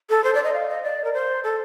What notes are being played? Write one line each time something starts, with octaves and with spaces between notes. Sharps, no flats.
A4
C5
D5
D#5
F5
D#5
D5
A#4
C5
A4